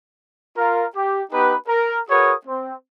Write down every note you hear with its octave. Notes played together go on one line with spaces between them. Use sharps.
F4 A#4
G4
B3 D#4 G4 B4
A#4
F#4 G#4 A#4 B4 C#5 D#6
C4